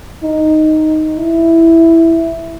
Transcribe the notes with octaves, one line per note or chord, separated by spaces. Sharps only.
D#4
E4